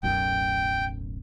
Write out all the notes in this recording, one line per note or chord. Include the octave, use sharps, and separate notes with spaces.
D1 B1 F#2 G5